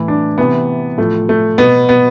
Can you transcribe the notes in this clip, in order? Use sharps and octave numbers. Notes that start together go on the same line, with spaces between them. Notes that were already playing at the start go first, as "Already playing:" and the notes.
Already playing: A2 E3 E4
D4
C3 E3 B3
A2 F3 A3
A3
B2 B3
B3